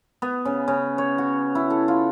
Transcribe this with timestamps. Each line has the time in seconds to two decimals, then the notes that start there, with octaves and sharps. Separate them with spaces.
0.22 B3
0.45 C#3
0.68 C#3
0.98 C#5
1.18 F#4
1.55 E4
1.70 A4
1.88 F4